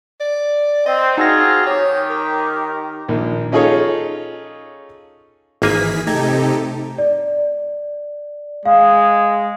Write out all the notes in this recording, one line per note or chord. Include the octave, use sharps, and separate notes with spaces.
D5
C4 D#5
C4 D#4 F4 F#4 G#4 A#6
D#3 G4 C#5
A#4
A#1 D#3
C#4 D#4 F4 G#4 A4 C#5
G#1 E3 A#3 G#4 G#5 B6
C3 A3 D#4 G4 A4 A#5 G#6
D5
G#3 F5